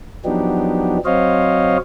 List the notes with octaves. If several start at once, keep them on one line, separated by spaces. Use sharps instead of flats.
F3 F#3 B3 D4 D#4 G4
F#3 C4 C5 C#5 D#5 F5